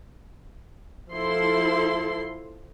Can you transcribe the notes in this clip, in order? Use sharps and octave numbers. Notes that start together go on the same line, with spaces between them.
F3 E4 A4 C6